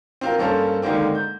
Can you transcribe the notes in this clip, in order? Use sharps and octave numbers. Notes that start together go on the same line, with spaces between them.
C4 F4 A#4
G2 A#3 C#4 A4 C5
D3 D#3 G#3 A#3 C4
G6